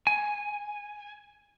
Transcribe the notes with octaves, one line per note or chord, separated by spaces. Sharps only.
G#5